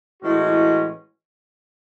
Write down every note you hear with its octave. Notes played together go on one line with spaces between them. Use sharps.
A2 E3 G#3 C#4 F#4